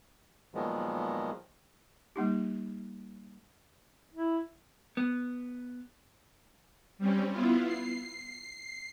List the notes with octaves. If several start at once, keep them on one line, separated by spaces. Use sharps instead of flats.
A#2 D#3 F3 F#3 G#3 B3
G3 A#3 D#4 G4
E4
B3
G3 C4 C#4
B3 E4 F4
C7